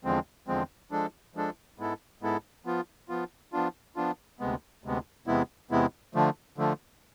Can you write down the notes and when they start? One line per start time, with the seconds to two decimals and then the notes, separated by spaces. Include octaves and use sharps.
0.04 E2 D3 F3 G#3 C4
0.48 E2 D3 F3 G#3 C4
0.91 F3 G#3 D4 A4
1.35 F3 G#3 D4 A4
1.78 G#2 G#3 B3 E4 A4
2.22 G#2 G#3 B3 E4 A4
2.65 F3 B3 F4
3.09 F3 B3 F4
3.53 F3 B3 D4 F4
3.96 F3 B3 D4 F4
4.40 D2 C3 G#3 B3
4.84 D2 C3 G#3 B3
5.27 E2 C3 G#3 B3 E4
5.71 E2 C3 G#3 B3 E4
6.14 D3 F3 A3
6.58 D3 F3 A3